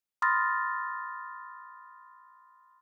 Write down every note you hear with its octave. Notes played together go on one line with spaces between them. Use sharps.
B5 C6 D#6 F6 A6 A#6